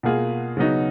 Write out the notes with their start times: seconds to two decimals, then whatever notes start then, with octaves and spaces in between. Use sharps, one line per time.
0.03 B2 A#3 F4 G#4
0.57 C#3 F#3 B3 D#4 F#4